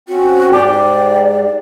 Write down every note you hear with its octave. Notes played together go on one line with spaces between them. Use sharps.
C4 C#4 F#4
G#2 G4 D5